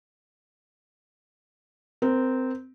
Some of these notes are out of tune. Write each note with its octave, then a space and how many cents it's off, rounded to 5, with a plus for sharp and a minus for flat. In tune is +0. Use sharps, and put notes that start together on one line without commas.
C4 -15 A#4 +0